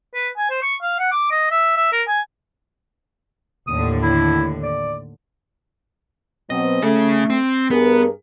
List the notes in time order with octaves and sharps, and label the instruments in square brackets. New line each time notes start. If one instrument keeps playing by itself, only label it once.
[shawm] B4
G#5
C5
C#6
F5
F#5
D6
D#5
E5
E5
A#4
G#5
[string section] D#2 A2 D3 [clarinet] D#6
[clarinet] E4
D5
[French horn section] B2 F#3 C4 [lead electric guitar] D#5
[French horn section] A3 [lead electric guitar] C#4 G#4
[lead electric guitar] C4
[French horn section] G2 G#4 A#4 [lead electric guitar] B3